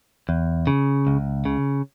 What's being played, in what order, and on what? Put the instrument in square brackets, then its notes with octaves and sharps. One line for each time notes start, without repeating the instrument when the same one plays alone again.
[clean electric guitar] E2
C#3
C#2
C#3